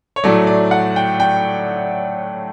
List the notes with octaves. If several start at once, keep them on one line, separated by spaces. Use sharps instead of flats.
C#5
A2 F#3 A3 D5
D5
F#5
G5
G5